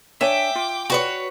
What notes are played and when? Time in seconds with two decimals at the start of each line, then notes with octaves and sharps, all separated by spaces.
0.21 D4 C#5 E5 G5 G#5 D6
0.55 F4
0.90 F#4 B4 C#5